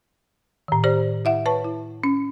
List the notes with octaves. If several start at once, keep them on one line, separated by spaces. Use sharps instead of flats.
A2 D#3
G4 C5 D5
E4 E5 F#5
B4 C#5 A5 C#6
E4
C#4